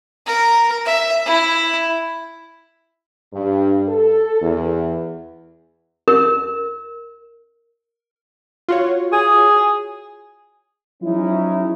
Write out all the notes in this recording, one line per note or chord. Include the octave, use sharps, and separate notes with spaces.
A#4
E5
E4
G2
A4
E2
A#4
F4 F#4 C#5
G#4
F3 F#3 G#3 C#4 D#4 E4